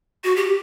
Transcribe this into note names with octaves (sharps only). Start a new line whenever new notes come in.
F#4
G4